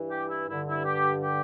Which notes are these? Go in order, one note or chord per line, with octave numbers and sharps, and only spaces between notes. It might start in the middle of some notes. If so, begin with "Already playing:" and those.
Already playing: G2 E3
G4
E4
G2 D3 E4
E4
G4
G4